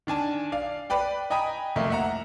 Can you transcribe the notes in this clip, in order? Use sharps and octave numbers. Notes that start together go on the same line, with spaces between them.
D#3 D4 G#5 A5
D5 F5
B4 D5 G5
D#5 G5 G#5 A#5 B5 D#6
C2 F2 A3 A#3 D#5
E5 F#5 A#5